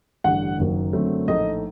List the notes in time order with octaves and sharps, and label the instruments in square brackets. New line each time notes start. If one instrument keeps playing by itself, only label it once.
[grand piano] A1 G2 D3 [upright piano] F#5
[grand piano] F#1 F#2 D#3 F#3 A#3
F#2 D3 F#3 A3 C4
[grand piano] A#1 A2 A3 D#4 A4 [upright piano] D#5